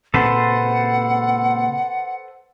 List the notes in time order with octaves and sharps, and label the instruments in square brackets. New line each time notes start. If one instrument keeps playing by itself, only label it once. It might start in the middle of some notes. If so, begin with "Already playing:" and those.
[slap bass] A#2 C#3 C4 [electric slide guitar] A4 B4 C5 [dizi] F#5